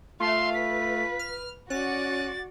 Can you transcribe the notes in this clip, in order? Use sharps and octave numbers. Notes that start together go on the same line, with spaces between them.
A3 F4 E5 F5 C6
B4 B6
F6
C#4 F#4 D5 F#6 A6